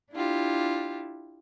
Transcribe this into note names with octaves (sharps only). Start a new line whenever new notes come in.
D4 E4 F4 G4